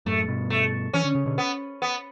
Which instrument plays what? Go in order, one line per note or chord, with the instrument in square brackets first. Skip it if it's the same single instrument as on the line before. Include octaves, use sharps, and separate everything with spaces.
[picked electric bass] F#2 A2 [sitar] A3
[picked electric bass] G2 B2
[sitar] A3
[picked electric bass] E3 [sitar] C#4
[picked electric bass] D3
C#3
B2 D3
[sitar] B3
B3